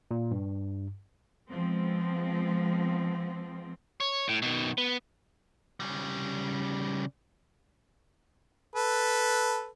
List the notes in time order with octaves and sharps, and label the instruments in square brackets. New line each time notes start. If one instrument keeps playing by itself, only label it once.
[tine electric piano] A#2
G2
[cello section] F3 G#3 B3 C4
[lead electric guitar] C#5
A2
B2 D#3
B3
C#3 G3
[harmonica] A4 B4